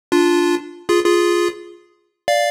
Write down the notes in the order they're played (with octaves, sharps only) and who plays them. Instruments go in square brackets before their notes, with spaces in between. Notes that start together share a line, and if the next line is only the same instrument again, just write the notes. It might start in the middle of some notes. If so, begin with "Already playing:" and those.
[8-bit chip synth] D4 F4
F4 G#4
F4 G#4
D5 F5